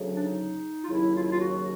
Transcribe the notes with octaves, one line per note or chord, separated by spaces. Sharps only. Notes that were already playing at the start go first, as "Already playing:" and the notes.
Already playing: D2 C#3 F#3
D4
D#4
F4
D#2 C#3 F#3 E4
F4
E4
F4
F#4